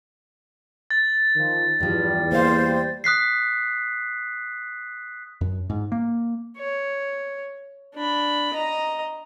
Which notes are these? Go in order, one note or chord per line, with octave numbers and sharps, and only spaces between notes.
A6
D#3 F3
E2 G2 F3 G3
A#3 C5 F5
D#6 F#6 B6 C7
F#2
G#2
A#3
C#5
D4 B5
D#5 A#5